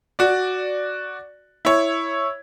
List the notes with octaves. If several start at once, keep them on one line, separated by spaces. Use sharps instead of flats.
F#4 D5
E4 C#5